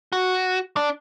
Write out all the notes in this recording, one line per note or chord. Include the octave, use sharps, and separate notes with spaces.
F#4
D4